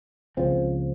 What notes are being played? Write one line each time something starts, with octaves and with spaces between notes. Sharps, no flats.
C#2 C#3 F3 C4